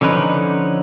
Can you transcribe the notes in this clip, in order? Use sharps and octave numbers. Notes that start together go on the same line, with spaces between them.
D3 F3 C#4 D#4 B4